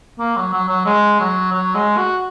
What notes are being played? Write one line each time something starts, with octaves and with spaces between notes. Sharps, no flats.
A#3
F#3
F#3
F#3
G#3
F#3
F#3
G#3
F#4